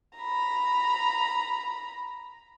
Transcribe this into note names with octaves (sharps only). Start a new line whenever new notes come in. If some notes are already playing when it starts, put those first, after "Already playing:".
A#5 B5